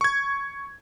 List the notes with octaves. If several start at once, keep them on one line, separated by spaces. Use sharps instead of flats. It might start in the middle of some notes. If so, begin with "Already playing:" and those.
C#6 G#6